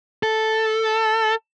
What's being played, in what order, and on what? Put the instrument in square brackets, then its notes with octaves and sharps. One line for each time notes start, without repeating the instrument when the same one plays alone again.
[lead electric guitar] A4